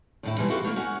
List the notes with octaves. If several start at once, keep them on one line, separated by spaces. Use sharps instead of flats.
D#2 A2 E4
B2 E3 G3 G#3
E4 F#4 G4 A4 F5
A3 A#3
C#4 F#4 F#5 G#5